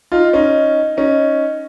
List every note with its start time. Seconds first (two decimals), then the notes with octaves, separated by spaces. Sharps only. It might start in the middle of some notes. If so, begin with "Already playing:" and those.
0.12 D#4 F4
0.33 C#4 D#4
0.97 C#4 D#4